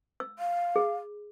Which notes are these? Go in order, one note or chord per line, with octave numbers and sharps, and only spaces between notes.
E6
F5
G#4